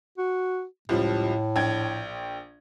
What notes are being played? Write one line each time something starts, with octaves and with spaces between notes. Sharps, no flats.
F#4
C#2 A2 F3 G3
A#1 G5 G#6